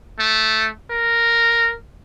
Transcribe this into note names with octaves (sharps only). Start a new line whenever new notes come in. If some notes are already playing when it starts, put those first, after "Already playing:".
A3
A#4